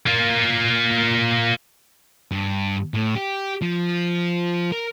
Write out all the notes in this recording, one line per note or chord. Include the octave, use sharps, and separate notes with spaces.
A#3 F4
G2
A2
G4
F3
A#4